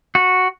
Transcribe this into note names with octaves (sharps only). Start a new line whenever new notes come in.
F#4